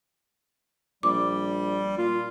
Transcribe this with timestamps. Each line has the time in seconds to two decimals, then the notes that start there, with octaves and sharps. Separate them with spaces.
1.03 A#1 G3 D6
1.98 A#2 F4